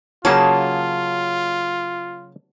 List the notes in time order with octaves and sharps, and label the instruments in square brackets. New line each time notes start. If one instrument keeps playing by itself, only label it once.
[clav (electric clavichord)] C#3 A#3 C#4 [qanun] F#3 G#4 [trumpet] F4 [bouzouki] A5